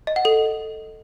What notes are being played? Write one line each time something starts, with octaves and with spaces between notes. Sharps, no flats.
D#5
F#5
A4